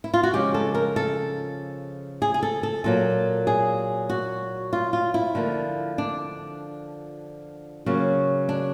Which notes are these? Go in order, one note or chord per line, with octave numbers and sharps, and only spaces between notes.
E4
F4
F#4
C#3 F3 G#3 G4
A4
A#4
A4
G#4
G#4
A4
A4
A#2 F#3 A#3 A4
G#4
F#4
F4
F4
E4
D3 F3 A#3
D4
C#3 F#3 A#3
D4